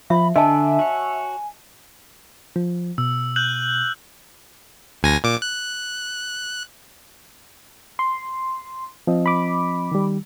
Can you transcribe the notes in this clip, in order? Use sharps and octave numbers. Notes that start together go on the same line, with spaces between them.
F3 E5 B5
D3 D4 D#5 E5 G#5 A5
F#4 C#5
F3
B2 E6
F#6 G6 F#7
D2 G#5 A#6
A#2 D6
F#6
C6
F3 C4 D#5
B5 D6
D#3 G3